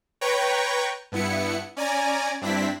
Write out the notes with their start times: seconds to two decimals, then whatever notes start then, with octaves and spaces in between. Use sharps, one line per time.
0.21 B4 C#5 G5 A#5 C#6
1.12 G2 B3 E4 C#7
1.77 C#4 D5 G#5 A#5
2.41 G2 C4 D4 E4 B6